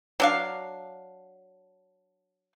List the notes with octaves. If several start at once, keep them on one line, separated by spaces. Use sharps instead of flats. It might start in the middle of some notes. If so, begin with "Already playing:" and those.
F#3 D4 F5